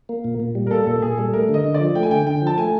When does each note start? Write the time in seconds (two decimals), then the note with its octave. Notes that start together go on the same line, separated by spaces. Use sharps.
0.09 A#3
0.25 A#2
0.40 A#2
0.55 G3
0.67 A#4
0.71 A#3 A4
0.87 A#2 A4
1.02 A#2 G#4
1.17 G3 A4
1.33 A3 A#4
1.49 D3
1.54 D#5
1.64 D3
1.74 D5
1.80 F3
1.95 A3 G5
2.03 G#5
2.11 D3 G5
2.26 D3 G5
2.42 F3 A5
2.58 A3 G#5